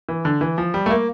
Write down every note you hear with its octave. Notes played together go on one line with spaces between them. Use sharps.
E3
D3
E3
F3
G3
A3
A#3